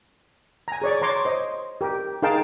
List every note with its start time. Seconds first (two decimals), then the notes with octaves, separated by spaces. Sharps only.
0.68 G#5 A#5
0.82 G#4 C#5 D5
1.02 C#5 A#5 C6 D6
1.25 C5 D#5
1.81 G4 A#4
2.22 D#4 G#4 A#4 F5 G5 A5